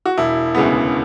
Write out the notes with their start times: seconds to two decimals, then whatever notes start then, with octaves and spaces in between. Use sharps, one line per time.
0.06 F#4
0.18 E1 E4
0.55 D2 C#3 G#3 B3